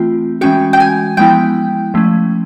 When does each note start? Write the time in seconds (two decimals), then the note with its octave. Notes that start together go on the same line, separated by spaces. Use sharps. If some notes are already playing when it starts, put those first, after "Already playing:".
Already playing: E3 A3 C4 F4 G5
0.41 E3 G#3 C#4 F#4 G5
0.73 G5
0.80 G#5
1.17 F3 G#3 B3 E4 G5
1.94 F3 A3 C#4